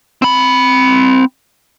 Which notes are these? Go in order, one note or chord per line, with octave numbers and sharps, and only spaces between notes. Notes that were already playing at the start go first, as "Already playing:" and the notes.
C4 B5